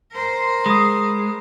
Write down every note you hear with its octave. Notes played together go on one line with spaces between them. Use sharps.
A#4 C5
G#3 B5 D#6